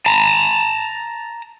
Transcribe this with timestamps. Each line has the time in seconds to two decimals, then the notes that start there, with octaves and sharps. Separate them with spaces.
0.06 A5 A#5